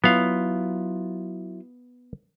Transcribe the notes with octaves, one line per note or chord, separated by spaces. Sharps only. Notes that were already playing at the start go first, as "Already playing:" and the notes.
F#3 B3 E4 F4 F5